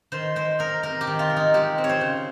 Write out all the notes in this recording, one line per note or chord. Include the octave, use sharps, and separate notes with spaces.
D#3 C5
G#3 C5
D#4 A#4
C3 A#4
G4
D#3
F4
G#3
D#4
G#3 G4
C4
C#5
C5
C#3